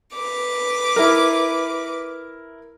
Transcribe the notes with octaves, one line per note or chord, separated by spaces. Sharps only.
B4 D6
E4 A#4